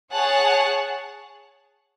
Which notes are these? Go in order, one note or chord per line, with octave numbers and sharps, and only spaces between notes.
G#4 C#5 F#5 A5